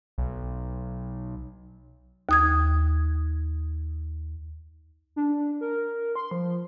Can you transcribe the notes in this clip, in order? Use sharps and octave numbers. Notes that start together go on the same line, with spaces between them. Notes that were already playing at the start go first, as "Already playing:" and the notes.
B1
D#2 D#6 G#6
D4
A#4
C6
F3